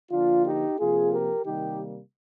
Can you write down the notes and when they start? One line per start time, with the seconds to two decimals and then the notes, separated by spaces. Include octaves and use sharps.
0.11 D3 F3 A#3 D4 F4
0.46 D#4 G4
0.79 C3 F3 A#3 F4 G#4
1.12 G4 A#4
1.46 C3 D#3 G3 A#3 D#4 G4